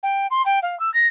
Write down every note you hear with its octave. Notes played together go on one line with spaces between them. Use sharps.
G5
C6
G5
F5
E6
A#6